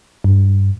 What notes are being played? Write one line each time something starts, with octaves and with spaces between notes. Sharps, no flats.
G2